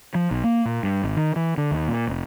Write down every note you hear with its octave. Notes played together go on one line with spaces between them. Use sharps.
F3
B1
A#3
A#2
G2
G#1
D#3
E3
D3
D#2
A#2
F1